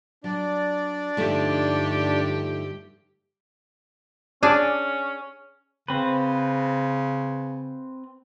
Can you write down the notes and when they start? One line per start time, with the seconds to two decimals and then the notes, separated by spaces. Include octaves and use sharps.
0.24 F#3 D4 D5
1.17 G2 D3 F3 A3 D#4 G4
4.43 C#4 D4 G#4 D5
5.88 C#3 C4 B4